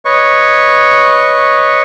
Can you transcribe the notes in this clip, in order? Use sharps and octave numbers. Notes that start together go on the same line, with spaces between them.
B4 C#5 D#5 C#6